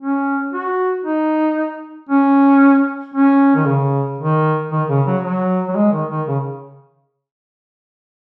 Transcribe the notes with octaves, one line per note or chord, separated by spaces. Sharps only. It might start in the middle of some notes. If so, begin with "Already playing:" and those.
C#4
F#4
D#4
C#4
C#4
D#3
C#3
D#3
D#3
C#3
F#3
F#3
F#3
G#3
D#3
D#3
C#3